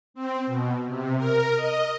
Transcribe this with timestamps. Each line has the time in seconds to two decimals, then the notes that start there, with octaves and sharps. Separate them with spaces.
0.14 C4
0.47 B2
0.87 C3
1.16 A#4
1.54 D#5